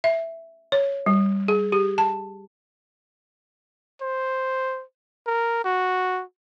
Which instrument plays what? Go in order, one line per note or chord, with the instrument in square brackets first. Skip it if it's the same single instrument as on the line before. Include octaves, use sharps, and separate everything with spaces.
[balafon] E5
C#5
G3
G#4
G4
A5
[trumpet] C5
A#4
F#4